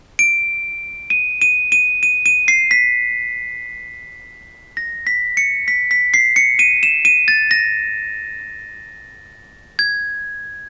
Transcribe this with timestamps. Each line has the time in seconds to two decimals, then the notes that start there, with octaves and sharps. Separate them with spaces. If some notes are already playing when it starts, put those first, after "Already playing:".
0.19 D7
1.10 D#7
1.42 D#7
1.72 D#7
2.03 D#7
2.26 D#7
2.48 C7
2.71 B6
4.77 A#6
5.07 B6
5.37 C#7
5.68 B6
5.91 B6
6.14 C7
6.36 C#7
6.59 D#7
6.83 E7
7.05 D#7
7.28 A6
7.51 A#6
9.79 G#6